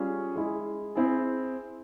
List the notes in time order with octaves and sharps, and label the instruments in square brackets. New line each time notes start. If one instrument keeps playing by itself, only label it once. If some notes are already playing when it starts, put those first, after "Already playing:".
Already playing: [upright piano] G3 C#4 F4 G#4
G#3 E4 G#4
C4 E4 G#4